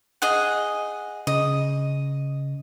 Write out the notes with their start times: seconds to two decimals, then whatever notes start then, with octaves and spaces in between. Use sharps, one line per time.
0.22 G#4 D#5 F#5
1.27 C#3 D#5